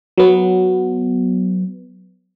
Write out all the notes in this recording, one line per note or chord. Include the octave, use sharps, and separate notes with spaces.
F#3 B3